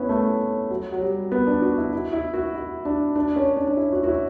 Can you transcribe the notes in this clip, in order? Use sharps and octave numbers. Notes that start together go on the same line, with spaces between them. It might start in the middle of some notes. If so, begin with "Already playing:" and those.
Already playing: B3 C#4 E4
A3
F#3
F#3
G3
B3
D4
F#4
E4
E4
E4
F#4
E4
D4
D4
C#4
D4
D4
E4
F#4
F#4
E4